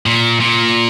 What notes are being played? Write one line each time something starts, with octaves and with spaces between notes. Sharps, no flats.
A#2
A#2